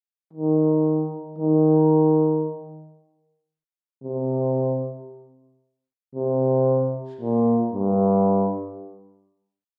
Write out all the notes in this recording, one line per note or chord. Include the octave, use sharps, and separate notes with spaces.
D#3
D#3
C3
C3
A#2
G2